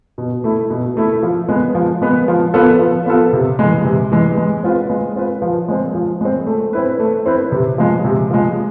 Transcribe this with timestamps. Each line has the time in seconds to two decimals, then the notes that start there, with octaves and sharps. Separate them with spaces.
0.18 B2
0.44 A3 E4
0.70 B2
0.97 A3 E4
1.23 F3
1.49 G#3 B3
1.75 F3
2.02 G#3 B3
2.28 F3
2.54 B3 F4 A4
2.79 F3
3.06 B3 F4 A4
3.33 C3
3.59 E3 G#3
3.84 C3
4.12 E3 G#3
4.38 G#3
4.63 C4 F4 B4
4.90 G#3
5.16 C4 F4 B4
5.42 F3
5.68 G#3 C4
5.95 F3
6.21 G#3 C4
6.47 A3
6.73 C4 E4 B4
7.00 A3
7.26 C4 E4 B4
7.52 C3
7.78 F3 G#3
8.04 C3
8.31 F3 G#3